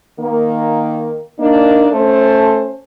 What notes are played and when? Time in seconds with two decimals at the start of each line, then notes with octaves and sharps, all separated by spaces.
0.20 D#3 A#3
1.40 A#3 D4 D#4
1.92 A3 C#4 C5